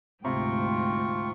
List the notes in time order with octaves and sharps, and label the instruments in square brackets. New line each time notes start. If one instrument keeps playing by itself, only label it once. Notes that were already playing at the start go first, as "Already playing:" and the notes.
[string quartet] D2 G#2 G5 [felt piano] C3 [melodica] F4 C#6